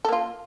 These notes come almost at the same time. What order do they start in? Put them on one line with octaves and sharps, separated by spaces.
A4 A#3 F4